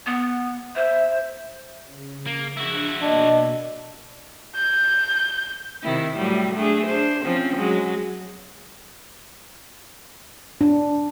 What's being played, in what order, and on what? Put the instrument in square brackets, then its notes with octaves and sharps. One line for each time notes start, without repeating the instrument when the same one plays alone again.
[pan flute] B3
[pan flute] C5 [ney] E5
[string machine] C#3
[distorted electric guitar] A#3
[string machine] F3 D4 G#4 [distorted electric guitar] E4 F#4
[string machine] B2 A#3 [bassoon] D4 [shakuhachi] D#5
[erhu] G6
[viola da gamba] C3 D#3 E4
A2 F#3 G3
A3 D4 G#4
D4 C5
F3 C4 C#4
F#3 G#3
[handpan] D4